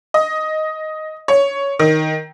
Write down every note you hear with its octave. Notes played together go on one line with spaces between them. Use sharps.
D#5
C#5
D#3